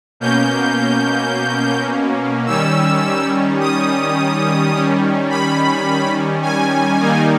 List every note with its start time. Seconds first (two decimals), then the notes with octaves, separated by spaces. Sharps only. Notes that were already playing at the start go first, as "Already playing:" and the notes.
0.20 B2 A#3 C#4 G6
2.46 D#3 G3 C#4 E6
3.61 D#6
4.74 D#3 G3 C#4
5.30 B5
6.43 G#5
7.00 D#3 G3 A#3 D#4